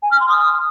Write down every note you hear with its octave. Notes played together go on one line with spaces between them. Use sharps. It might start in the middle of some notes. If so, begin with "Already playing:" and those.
G#5
F6
C6
D#6